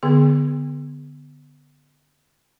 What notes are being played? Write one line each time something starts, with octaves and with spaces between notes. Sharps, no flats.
D3 B3 G#4